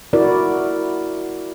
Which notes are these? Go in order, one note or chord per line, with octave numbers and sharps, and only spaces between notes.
E4 F#4 A#4 D5